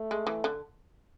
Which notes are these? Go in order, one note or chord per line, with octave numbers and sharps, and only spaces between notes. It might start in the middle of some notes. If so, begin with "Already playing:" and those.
Already playing: A3
G#3
E3
D3